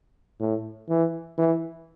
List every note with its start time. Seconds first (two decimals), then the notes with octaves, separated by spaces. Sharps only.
0.40 A2
0.89 E3
1.38 E3